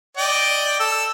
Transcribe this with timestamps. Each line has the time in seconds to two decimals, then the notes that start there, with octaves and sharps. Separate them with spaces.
0.17 D5 D#5 G5
0.80 A4 E6